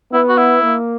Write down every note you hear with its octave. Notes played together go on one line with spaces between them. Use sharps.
B3 E4
F#4
E4
A#3